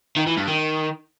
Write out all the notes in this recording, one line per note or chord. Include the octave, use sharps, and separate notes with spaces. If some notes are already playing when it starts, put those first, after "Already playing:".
D#3
E3
G2
D#3